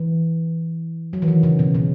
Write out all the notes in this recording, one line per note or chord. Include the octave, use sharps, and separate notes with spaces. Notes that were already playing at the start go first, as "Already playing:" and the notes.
Already playing: E3
F#3
E3
D#3
C#3
B2
B2